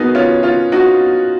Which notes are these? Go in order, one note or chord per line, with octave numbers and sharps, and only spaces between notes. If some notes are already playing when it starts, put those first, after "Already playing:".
Already playing: B3 D#4 F#4 G#4 A#4
C#4 F4
C#4 F4
D#4 F#4